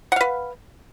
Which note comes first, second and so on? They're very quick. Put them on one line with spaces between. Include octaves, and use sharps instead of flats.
F#5 F5 B4